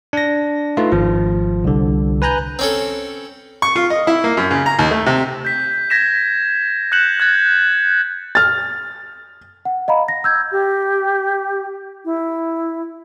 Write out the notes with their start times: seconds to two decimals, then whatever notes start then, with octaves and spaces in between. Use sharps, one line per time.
0.13 D4 A#6
0.77 A3 D#4 F4 B4
0.92 G#1 F3
1.64 C2 D3
2.22 B4 G#5 A#5 F#6 G6
2.59 C4 C#4 A4
3.62 C#6
3.76 F4
3.90 D#5
4.07 E4
4.24 A#3
4.37 F#2
4.51 C#3
4.66 A#5
4.79 D#2
4.91 A3
5.06 C3
5.45 G6 B6
5.90 G#6 A#6 B6 E7
6.92 F#6 G6 C#7 E7 F#7
7.20 F#6 G#6 A6
8.35 F6 A6
9.65 F#5
9.88 D#5 F5 A#5 B5
10.08 A#6
10.24 E6 G6 G#6
10.52 G4
12.05 E4